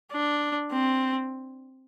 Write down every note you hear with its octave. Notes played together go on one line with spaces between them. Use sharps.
D4
C4